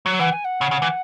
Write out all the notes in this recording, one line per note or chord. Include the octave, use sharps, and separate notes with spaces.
F#3
E3 F#5
G#5
F#5
C#3
C#3
E3